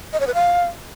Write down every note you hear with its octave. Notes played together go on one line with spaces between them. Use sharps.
D#5
C#5
B4
F5